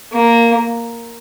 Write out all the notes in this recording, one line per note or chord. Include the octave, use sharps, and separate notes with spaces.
A#3